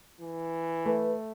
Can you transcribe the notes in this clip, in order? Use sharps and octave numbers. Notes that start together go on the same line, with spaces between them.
E3
A3 B4